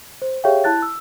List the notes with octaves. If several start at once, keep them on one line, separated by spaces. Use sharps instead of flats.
C5
G4 G#4 C#5 E5 F5 G5
E4 A5 F#6 A6
E6